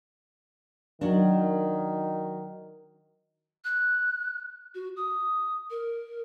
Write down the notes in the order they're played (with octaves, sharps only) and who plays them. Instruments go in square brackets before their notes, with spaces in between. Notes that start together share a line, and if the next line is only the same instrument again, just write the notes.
[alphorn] D#3 [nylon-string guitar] F#3 D4
[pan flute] F#6
F#4
D#6
A#4